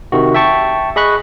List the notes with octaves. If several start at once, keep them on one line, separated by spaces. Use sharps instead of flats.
C3 D#3 F#4
E5 G5 A5 C#6
G#4 D#5 B5 C#6 F#6